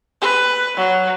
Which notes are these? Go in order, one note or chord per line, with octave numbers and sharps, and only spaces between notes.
B4
F#3